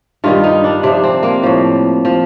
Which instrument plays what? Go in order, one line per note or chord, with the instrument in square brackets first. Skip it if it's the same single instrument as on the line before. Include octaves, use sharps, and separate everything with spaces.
[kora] G2 D#3 G3 F4
D#4
D4
C3 F3 D4
C4
A#3
A2 F3
F3